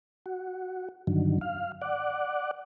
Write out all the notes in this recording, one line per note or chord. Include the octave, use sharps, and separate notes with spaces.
F#4
G2 D3 D#3 F#3
F5
D5 F#5